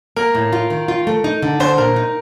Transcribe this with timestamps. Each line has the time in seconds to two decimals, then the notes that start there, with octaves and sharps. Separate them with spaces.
0.16 A#3 A#4
0.35 A2
0.53 F4
0.70 D#3
0.88 F4
1.07 A3
1.24 D#4
1.42 D3
1.60 D4 C5
1.78 A#2 A#4
1.96 D#4